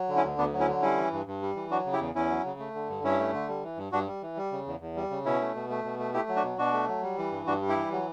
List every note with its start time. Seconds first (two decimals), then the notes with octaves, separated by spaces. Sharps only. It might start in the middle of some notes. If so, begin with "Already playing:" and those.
Already playing: F#3
0.09 D3
0.16 C#4 E4
0.23 D2
0.38 D2 B3 D4
0.53 F#3
0.60 C#4 E4
0.68 D3
0.82 G3 C#4 E4
0.97 E3
1.12 G2
1.26 G2
1.42 G3
1.56 E3
1.71 F#3 D4 F#4
1.86 C#3
1.93 E4 G4
2.00 E2
2.15 E2 C#4 E4
2.30 F#3
2.45 C#3
2.59 A3
2.75 D3
2.89 G2
3.03 G2 C#4 E4
3.19 A3
3.34 D3
3.48 G3
3.63 E3
3.78 G2
3.92 G2 D4 F#4
4.07 G3
4.22 E3
4.37 G3
4.52 C#3
4.66 E2
4.80 E2
4.96 G3
5.10 C#3
5.25 B2 C#4 E4
5.40 A3
5.55 B2
5.69 A3
5.84 B2
5.99 A3
6.14 A3 E4 G4
6.29 F#3
6.36 D4 F#4
6.44 B2
6.58 B2 D4 F#4
6.73 A3
6.88 F#3
7.03 G3
7.18 E3
7.32 G2
7.47 G2 D4 F#4
7.61 G3
7.69 E4 G4
7.76 E3
7.92 F#3